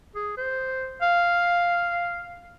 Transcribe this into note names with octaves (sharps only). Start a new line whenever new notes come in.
G#4
C5
F5